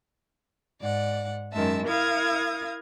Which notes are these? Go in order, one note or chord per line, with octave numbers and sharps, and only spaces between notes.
G#2 D5 F#5
F#2 D#3 G#3 E5 A5
E4 A#4 F5 D#6 G#6